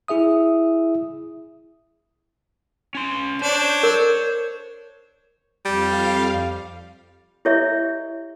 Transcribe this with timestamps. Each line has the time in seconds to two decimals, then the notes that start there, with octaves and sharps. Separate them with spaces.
0.08 E4 G#4 E5 D#6
2.95 C#4 C6
3.42 D4 C5 C#5
3.83 A#4
5.66 F2 G3 F5
7.45 E4 G4 C#5 D#5 E5